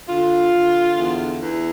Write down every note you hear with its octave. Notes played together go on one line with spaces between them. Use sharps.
D3 F4
D3
E2
E2